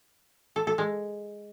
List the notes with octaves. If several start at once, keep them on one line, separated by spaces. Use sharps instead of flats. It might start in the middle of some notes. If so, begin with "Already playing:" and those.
A4
A4
G#3